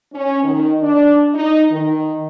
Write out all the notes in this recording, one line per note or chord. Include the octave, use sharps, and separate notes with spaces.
C#4
D#3
D4
D#4
D#3